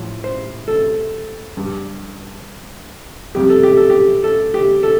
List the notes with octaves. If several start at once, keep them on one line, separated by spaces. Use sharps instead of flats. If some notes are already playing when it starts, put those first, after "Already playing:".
Already playing: A2 F3
C5
A4
G2 G3
F2 C3 G3 G4
A4
G4
A4
G4
A4
G4
A4